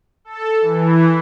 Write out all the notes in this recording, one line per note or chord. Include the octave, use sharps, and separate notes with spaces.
A4
E3